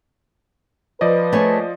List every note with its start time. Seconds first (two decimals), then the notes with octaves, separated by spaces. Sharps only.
1.01 F3 B4 D5 D#5
1.33 A3 G#4 C#5